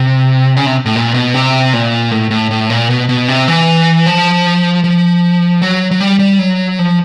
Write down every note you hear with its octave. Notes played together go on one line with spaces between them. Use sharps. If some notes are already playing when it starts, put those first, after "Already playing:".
Already playing: C3
C#3
C3
A2
A#2
B2
C3
A#2
A2
A2
A2
A#2
B2
B2
C3
E3
F3
F3
F#3
F#3
G3
G3
F#3
F3